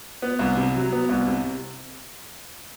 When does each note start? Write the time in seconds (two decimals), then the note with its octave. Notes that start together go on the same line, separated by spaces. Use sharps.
0.22 B3
0.39 C2
0.57 C3
0.74 F#3
0.92 B3
1.09 C2
1.27 C3